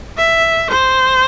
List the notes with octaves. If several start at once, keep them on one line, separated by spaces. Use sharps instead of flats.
E5
C5